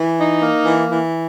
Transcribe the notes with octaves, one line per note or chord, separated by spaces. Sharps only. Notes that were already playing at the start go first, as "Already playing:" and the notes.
Already playing: E3
D#4
A#3
E3
E3